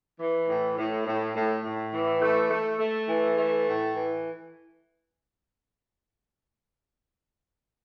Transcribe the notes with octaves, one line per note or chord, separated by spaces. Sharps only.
E3
A2
A2
A2
A2
A2
E3
A3
A3
A3
E3
A3
A2
E3